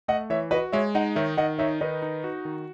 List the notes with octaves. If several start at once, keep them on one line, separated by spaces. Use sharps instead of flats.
A3 D#5 F#5
E3 C#5 E5
F#4 B4 D#5
G#3 C#5 E5
D#4 D#5 F#5
D#3 C#5 E5
D#3 D#5 F#5
D#4 C#5 E5
D#3 B4 D#5
D#4
F#4
D#3